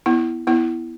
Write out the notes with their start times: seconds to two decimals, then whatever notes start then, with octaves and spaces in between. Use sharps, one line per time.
0.06 B3 E4
0.47 B3 E4